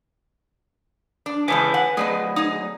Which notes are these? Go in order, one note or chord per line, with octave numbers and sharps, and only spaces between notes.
D4
C#3 E3 G#3 B4 G#5 A5
F#5
F#3 A3 G#4 B4 D#5
D#4 G#4